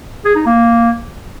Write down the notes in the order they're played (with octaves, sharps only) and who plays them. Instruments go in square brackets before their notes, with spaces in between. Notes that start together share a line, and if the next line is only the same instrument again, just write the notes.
[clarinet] G#4
D#4
A#3